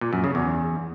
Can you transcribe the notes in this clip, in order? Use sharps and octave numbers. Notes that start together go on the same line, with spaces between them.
A#2
F#2
C#3
E2